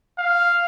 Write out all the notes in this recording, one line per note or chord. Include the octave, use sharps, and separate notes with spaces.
F5